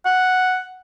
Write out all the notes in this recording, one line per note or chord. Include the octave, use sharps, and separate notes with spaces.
F#5